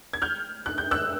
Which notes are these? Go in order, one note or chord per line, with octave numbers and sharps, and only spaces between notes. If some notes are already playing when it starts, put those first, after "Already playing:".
G#6
F6 G6
F#6
G6
E6 F#6